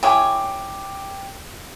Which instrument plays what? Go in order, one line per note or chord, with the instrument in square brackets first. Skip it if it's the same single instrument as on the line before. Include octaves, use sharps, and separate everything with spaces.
[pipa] E4 G#4 C#5 [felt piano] G5 D6